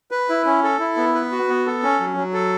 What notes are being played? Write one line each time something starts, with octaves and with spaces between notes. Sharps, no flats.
B4
E4
C#4
A4
E4
B3
B4
F#4
B3
A4
C#4
F#3
F#3
A4